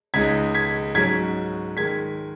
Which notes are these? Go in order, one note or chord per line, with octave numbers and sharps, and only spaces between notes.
C#2 C#3 G#3 D#4 G#6 B6
G#6 B6
G#2 F#3 C#4 G#6 B6
D#3 G#3 G#6 B6